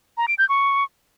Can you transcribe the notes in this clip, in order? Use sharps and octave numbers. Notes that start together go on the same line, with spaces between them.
A#5
D7
G6
C#6